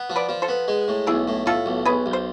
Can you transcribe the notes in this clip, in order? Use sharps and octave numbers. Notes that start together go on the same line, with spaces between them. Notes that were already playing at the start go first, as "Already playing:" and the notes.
Already playing: B3
F3
B4 D5
F3
A4 C5
B3
G#3
A2
B1 E4 G#4
A2
A2 F4 A4
B1
B1 G#4 B4
B1
C5